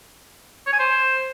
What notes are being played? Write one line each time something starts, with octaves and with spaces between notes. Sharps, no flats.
C#5
G#5
C5